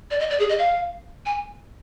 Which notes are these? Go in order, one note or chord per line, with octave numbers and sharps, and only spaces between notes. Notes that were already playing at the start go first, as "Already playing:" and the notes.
D5
D#5
D5
G#4
D#5
F5
G#5